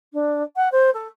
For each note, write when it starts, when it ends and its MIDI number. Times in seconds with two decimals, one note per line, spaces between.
0.13 0.42 62
0.56 0.68 78
0.72 0.90 72
0.93 1.07 69